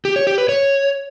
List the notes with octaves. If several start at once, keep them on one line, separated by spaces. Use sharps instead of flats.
G4
C#5
G4
B4
C#5